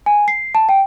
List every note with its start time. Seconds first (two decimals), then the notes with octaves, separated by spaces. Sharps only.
0.06 G#5
0.28 C7
0.55 A5
0.69 G5